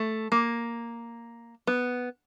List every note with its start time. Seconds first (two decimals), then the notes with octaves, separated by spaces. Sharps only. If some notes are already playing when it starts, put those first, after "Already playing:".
Already playing: A3
0.32 A#3
1.67 B3